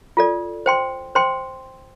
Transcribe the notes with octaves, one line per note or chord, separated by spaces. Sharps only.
F4 A4 D5
C5 G5 C6
C5 G5 C6